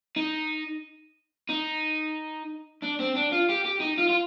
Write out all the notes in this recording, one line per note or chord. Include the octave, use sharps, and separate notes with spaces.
D#4
D#4
D4
C4
D4
F4
G4
G4
D#4
F4
F4